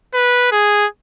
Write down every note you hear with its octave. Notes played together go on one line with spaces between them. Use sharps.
B4
G#4